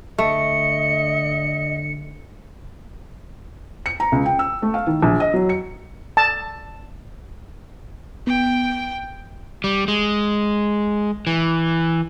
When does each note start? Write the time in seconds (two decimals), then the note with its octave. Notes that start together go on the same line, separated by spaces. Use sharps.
0.18 D3 A3 D#5 C#7
3.86 C#7
4.00 A#5
4.12 C#2
4.26 G5
4.39 E6
4.62 A3
4.74 F5
4.87 D#3
5.03 A#1
5.20 D#5
5.34 F#3
5.49 C#7
6.17 A5
8.27 B3 G5 D7
9.64 G3
9.88 G#3
11.27 E3